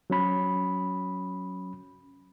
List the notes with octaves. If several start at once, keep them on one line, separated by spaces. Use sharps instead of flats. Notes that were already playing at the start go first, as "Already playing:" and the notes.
F#3 C#4 B5